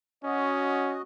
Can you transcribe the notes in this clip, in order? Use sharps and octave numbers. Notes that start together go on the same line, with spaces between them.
C#4 F#4 D#5